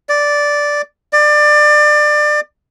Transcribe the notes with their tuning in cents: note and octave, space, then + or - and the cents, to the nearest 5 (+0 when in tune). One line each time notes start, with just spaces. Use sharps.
D5 -5
D5 +25